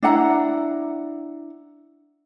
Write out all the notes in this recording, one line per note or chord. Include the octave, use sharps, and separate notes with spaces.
D4 E4 F#5 A#5